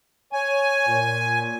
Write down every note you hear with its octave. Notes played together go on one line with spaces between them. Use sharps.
C#5 G#5
A#2